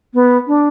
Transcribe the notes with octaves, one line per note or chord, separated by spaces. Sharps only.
B3
D4